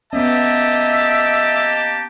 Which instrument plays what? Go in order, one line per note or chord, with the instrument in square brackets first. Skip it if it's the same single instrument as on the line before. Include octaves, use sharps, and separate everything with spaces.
[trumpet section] A#3 G4 A5 [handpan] B3 C#4 [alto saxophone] D#5 [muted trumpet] E5